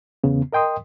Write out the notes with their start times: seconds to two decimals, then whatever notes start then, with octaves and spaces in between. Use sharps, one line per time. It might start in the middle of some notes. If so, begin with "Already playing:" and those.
0.24 E2 C#3 B3
0.53 A#4 D#5 G5 C6 D#6